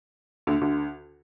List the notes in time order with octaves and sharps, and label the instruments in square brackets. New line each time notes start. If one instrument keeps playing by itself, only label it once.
[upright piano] D2 D3
D2 D3